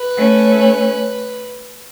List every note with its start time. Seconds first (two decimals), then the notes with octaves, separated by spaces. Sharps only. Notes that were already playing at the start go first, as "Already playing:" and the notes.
Already playing: B4
0.17 A3 C#4